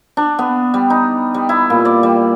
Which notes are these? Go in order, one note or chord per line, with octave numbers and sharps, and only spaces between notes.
D4
B3
G3
D#4
G3
E4
A#2
D5
G3